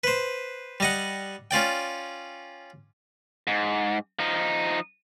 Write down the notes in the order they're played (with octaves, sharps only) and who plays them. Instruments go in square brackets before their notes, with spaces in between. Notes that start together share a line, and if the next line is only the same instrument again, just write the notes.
[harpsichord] B4 C5
G3 D#5 F#5
C#4 F4 D5 G5
[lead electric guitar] G#2
F3 D#4